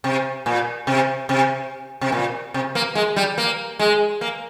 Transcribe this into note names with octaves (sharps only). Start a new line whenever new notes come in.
C3
A#2
C3
C3
C3
A#2
C3
A#3
G#3
G3
A#3
G#3
A#3